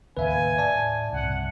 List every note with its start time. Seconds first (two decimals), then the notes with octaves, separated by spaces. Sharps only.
0.17 D#2 A2 C#3 B4 E5 F5 G#5
0.58 A2 D5 E5 A5
1.13 C2 G2 C#3 F#5